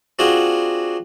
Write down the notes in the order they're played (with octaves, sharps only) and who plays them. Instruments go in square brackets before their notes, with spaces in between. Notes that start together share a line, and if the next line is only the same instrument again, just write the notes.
[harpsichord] C4 D4 F4 F#4 G#4